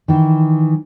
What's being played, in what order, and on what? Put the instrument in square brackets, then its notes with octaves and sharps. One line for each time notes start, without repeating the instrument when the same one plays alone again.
[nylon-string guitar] D#3 E3